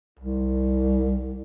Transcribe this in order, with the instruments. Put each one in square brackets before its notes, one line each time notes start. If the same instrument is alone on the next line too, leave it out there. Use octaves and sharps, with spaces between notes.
[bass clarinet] C2